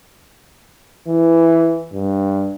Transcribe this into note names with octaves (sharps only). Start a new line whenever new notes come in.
E3
G2